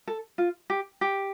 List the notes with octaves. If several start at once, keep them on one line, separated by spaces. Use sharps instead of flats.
A4
F4
G4
G4